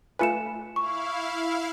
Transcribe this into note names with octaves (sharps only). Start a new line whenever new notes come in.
A3 F4 B4 G#5 C#7 E7
E4 F5 C#6